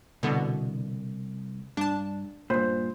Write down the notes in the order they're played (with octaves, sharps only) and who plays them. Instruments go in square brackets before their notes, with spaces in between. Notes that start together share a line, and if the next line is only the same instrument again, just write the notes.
[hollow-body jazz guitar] C2 [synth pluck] B2 D3 B3
[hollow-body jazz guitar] G2 [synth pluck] D4 A5
[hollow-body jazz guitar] G2 A#2 [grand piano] C5